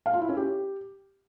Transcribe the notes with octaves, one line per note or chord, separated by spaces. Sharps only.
F5
F4
E4
C#4
G4